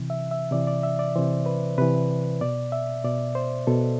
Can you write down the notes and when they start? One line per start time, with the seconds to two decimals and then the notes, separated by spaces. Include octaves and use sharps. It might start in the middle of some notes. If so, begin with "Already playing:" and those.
Already playing: C3 E3
0.10 E5
0.31 E5
0.51 C3 E3 D5
0.67 D5
0.83 E5
0.99 D5
1.15 C3 E3 C5
1.46 B4
1.78 C3 E3 B4
2.41 B2 D5
2.72 E5
3.04 B2 D5
3.35 C5
3.67 B2 A4